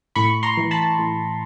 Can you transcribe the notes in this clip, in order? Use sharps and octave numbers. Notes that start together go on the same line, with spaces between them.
A2 B5 C#6
A#5 C6
E3
A5 B5
A2